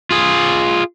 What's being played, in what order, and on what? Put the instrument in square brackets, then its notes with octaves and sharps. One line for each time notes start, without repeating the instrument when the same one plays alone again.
[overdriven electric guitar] F4 G#4